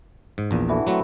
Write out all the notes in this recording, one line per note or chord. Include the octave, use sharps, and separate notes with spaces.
G#2
A#1 E2 A#2
D3 E3 F#4
F#3 A3 C4 F#4